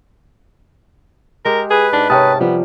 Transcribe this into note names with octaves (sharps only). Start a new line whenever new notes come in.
G#3 G4 A#4
G#4 B4
G#2 D4
C3 C#4 A#4 C#5 G5 A5 D#6
F3 G3 B3